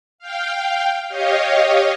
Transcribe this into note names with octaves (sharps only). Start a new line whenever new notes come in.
F5 G5
G4 C#5 D#5 F5